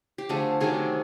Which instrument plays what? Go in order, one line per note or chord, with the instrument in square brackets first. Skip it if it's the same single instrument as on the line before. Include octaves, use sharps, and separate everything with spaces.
[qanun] G4
D3 F3 A3 G#4
C3 D#3 F#3 A3 G#4